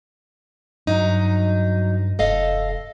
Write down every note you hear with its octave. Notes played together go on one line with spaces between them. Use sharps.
G2 F#3 D#4
F1 A4 D#5 F5